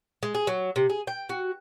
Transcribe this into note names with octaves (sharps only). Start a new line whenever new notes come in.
G#3
G#4
F#3
C3
G#4
G5
F#4